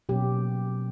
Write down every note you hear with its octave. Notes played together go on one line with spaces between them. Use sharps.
B2 F#3 A#3 C#4 G4